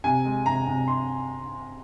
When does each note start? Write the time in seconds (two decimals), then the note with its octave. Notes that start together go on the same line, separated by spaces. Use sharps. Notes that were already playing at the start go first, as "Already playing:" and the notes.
0.04 C3 G#5
0.25 G#3
0.46 C3 A#5
0.67 C3
0.88 C3 C6